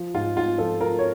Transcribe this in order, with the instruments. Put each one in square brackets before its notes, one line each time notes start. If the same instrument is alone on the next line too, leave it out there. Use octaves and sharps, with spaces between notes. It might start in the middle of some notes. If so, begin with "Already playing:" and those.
Already playing: [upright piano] F3
G#2 F4
G#2 F4
F3 A4
F3 A#4
C#5